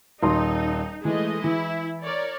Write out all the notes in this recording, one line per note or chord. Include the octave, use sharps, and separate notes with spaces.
D#1 D#3 D#4 C6
E3 G#3 A3 D#5
E3 E4
A#4 C#5 D5